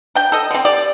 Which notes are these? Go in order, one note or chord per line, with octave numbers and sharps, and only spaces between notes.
D4 G5
A4 D#5
D3 C4
G4 D5